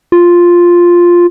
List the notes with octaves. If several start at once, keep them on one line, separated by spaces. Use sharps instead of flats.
F4